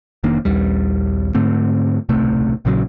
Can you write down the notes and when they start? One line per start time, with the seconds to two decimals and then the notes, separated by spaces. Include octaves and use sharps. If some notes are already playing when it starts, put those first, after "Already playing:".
0.24 F1 D#3 A#3 D4
0.45 A#1 D#2 G3
1.34 G#2 D3 A3 C4
2.09 D1 B1 C3 A3
2.65 A#1 A#2 C#3 F#3